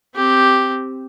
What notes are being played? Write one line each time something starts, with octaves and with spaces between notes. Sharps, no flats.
C4 G4